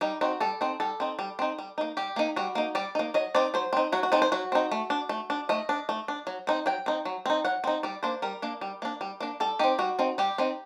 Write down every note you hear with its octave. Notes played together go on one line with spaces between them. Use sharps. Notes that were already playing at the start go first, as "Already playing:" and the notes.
G3 D#4
C4 D#4 F#4
G3 A4
C4 D#4
G3 A4
C4 D#4
G3
C4 D#4
G3
A#3 D#4
G3 G4
A#3 D#4
G3 F#4
A#3 D#4
G3 D5
A#3 D#4
F#3 D#5
C4 D#4 D5
F#3 C5
C4 D#4
F#3 F#4
F#4
C4 D#4 A4
C5
F#3 F#4
C4 D#4
A3
D4
A3
D4
A3 D#5
D4
A3
D4
F#3
C4 D#4
F#3 G5
C4 D#4
F#3
C4 D#4
F#3 F#5
C4 D#4
G3 D5
A#3 D4 C5
G3 A#4
A#3 D4
G3
A#3 D4
G3
A#3 D4
G3 A4
C4 D#4 G4
G3 F#4
C4 D#4
G3 G4
C4 D#4